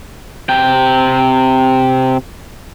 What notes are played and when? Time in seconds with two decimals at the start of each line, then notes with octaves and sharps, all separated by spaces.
0.49 C3 G5